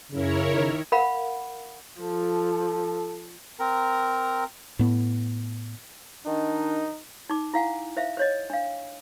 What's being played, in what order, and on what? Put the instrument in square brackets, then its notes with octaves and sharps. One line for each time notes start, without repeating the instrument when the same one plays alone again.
[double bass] F#2 [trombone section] C#3 [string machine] E4 A#4 C#5
[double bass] D#3
[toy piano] A#4 F5 F#5 B5
[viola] F3 [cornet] A4
[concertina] C4 A#4 A#5
[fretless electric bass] A2 B3
[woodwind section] D#3 D4 [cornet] D#4
[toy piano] D#4 D6
E4 F5 F#5 G#5
C5 E5 F5
C5 C#5 D#5
D4 F5